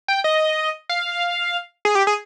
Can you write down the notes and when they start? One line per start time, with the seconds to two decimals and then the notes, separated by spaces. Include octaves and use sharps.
0.08 G5
0.24 D#5
0.89 F5
1.85 G#4
1.95 G4
2.07 G#4